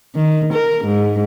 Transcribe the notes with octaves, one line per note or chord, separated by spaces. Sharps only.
D#3
A#4
G#2